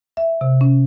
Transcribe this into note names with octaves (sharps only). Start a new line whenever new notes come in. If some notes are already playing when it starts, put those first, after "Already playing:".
E5
C3
C#4